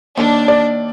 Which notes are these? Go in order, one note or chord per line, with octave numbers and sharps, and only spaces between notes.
D#2 D4
D5